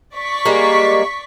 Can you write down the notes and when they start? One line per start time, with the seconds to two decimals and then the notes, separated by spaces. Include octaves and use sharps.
0.15 D5 C#6 B6
0.45 G3 G#3 A#3